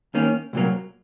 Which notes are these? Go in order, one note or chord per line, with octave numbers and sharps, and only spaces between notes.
D#2 D#3 A#3 C#4
C2 A#2 F#3 A#3